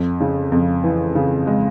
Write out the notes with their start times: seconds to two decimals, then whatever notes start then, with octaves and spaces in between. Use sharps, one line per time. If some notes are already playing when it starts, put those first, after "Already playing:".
Already playing: F2
0.20 C#3
0.52 F2
0.84 E3
1.15 C#3
1.47 G#3